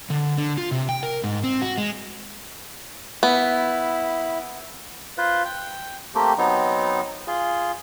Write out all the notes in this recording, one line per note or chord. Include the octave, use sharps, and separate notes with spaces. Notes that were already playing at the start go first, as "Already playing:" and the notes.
D3
D3
F4
C3
G5
A#4
G#2
C4
F#4
G#3
B3 E4
F4 B4 C5
G5
A3 A#3 C4 G4
F#3 B3 C4 D#4
F4 G#4